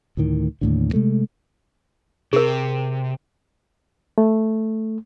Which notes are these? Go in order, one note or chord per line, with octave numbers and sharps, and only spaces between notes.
D2 A2 D#3
D#2 A2 D3
C3 G#3 A3
C3 G#4 A#4
A3